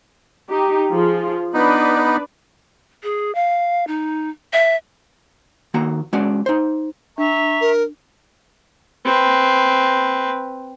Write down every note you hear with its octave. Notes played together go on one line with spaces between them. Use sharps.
D#4 G4
F3 F4 G#4
B3 D4 D#4 B4 D5
G#4
F5
D#4
E5
D#3 A#3 F#4 A#5
G#3 C#4 F#4 D5
D#4 C5
D4 E5 A#5 C#6
A#4
C4 B4